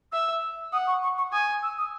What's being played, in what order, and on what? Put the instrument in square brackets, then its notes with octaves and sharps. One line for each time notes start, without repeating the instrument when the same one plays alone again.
[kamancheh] E5 [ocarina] E6
[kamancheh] F#5 [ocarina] D#6
[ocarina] C#6
C#6
C#6
[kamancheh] G#5 [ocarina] D#6
[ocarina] E6
D#6